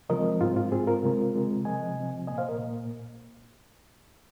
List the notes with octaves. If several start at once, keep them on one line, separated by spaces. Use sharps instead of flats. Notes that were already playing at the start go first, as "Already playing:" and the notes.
C3 F3 G#3 C4 A#4 D#5
G#2 G#3 C4 F4
F4
G#2 G#3 C4 G#4
F4 A#4
C3 G#3 C4
C3 G#3 C4
C3 F3 C4 D#5 G#5
C3 F3 C4
A#2 A#3 D#5 G#5
C5 F5
A#4 D#5
A#2 A#3